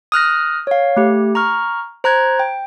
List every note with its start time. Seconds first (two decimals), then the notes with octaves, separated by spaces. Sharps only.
0.12 D#6 F6 F#6 A#6
0.67 C#5 F5
0.97 A3 G4
1.35 A#5 C#6 F6
2.04 C5 A#5 F#6 G#6
2.39 G5